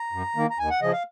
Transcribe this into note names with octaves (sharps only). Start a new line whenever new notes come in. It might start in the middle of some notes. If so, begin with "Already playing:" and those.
Already playing: A#5
F#2
D#3 A#3
A#5
D#2 G#5
F#5
C#3 F3 D#5
F5